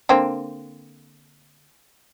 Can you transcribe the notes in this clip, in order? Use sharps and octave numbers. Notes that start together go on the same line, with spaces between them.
D3 A#3 C4